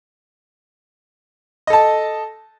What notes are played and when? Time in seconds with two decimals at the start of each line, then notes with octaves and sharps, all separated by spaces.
1.67 D#5
1.70 A4
1.73 A5